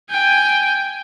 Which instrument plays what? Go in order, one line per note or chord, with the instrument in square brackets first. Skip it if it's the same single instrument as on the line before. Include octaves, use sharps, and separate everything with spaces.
[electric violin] G5 G#5